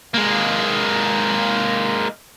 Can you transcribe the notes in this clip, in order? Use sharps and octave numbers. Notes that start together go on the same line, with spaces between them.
G#3 A#3